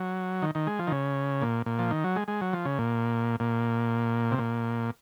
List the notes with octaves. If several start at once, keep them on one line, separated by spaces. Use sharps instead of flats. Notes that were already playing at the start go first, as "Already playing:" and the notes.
Already playing: F#3
D#3
D#3
G#3
F3
D#3
C#3
A#2
A#2
F3
D#3
F#3
G#3
G#3
F#3
F3
C#3
A#2
A#2
C3
A#2